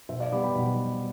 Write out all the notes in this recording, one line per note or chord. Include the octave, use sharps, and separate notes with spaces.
B2 C5 E5
D5 F5
G3 B3 B5 D6
G5 B5
B2